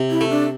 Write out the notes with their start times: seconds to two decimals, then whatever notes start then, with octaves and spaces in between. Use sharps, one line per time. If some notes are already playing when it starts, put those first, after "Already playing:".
Already playing: C3
0.11 E4
0.21 A3
0.31 D4